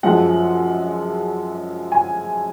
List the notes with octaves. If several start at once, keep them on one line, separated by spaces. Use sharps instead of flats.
F#2 F3 G#3 F#5
G#5